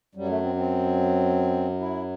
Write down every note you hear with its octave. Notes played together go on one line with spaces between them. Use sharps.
F#2 F#3 G3
A3
C4
C4
E4